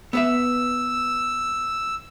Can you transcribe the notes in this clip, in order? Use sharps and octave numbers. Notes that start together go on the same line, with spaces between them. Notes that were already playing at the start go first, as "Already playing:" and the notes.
B3 B4 E5 E6